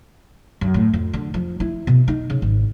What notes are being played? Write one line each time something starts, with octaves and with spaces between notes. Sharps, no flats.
F#2
A2
F2
D3
F3
E4
B2
D#4
C#3
G#1